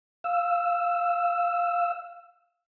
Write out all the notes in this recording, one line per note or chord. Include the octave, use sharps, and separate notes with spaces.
F5 E6